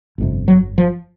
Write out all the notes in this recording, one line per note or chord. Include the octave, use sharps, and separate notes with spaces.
G1 F2 C3
F#3
F3